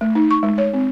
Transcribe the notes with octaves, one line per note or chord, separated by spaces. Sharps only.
A3
D#4
C#6
G#3
C#5
C4